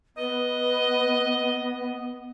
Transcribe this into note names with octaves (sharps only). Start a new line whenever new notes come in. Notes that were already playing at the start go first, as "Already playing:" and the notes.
B3 B4 D#5